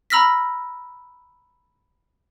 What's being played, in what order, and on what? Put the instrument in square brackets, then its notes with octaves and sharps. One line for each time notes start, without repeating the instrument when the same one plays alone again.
[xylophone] A#5 B5 E6 F6 A#6 B6